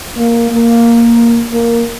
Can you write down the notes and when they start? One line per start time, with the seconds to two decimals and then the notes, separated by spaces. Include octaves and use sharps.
0.17 A#3
0.51 A#3
1.51 A#3